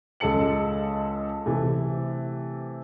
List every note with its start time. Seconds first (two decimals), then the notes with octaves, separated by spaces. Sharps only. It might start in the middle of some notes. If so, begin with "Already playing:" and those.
0.20 C#2 G#3 A4 A5 C#7 F#7
1.46 C3 E3 A3